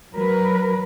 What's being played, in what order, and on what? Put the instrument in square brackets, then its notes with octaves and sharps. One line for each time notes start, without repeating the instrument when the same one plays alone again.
[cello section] F#3 A#4 B4